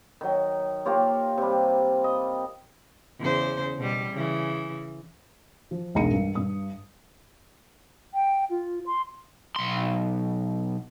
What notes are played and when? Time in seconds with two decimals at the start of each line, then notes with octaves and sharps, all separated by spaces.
0.21 D#3 F#3
0.86 A#3 F4 G4 C#5
1.38 C3 G3
2.04 D#5
3.19 E2 C#3 C5
3.78 B2 G3
4.13 C#3 E3
5.71 F3
5.95 E1 B1 G#3 A#5 C#7 D#7
6.11 G2
6.35 G2 D#6
8.14 G5
8.50 F4
8.86 C6
9.56 B1 C6